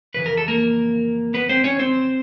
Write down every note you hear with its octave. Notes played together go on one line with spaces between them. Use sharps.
F2 C#3 E3 B4
A#4
A4
A#3 A#4
B3 B4
C4 C5
C#4 C#5
C4 C5